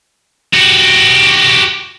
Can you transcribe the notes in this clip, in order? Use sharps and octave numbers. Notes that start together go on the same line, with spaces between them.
F#4 G4